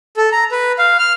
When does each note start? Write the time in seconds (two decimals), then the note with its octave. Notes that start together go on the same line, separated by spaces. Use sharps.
0.17 A4
0.32 A#5
0.51 B4
0.79 F5
0.99 F6